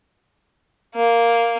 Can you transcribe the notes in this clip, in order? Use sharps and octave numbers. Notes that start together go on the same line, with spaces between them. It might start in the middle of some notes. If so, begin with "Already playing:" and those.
A#3